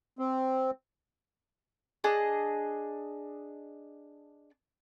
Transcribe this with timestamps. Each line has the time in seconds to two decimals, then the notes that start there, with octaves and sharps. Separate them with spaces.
0.19 C4
2.04 D4 G#4 D#5